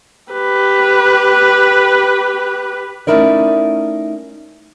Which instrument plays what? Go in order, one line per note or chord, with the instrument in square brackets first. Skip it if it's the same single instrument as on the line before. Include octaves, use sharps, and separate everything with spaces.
[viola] G4 B4
[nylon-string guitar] A3 C#4 D#4 E4 A#4 D5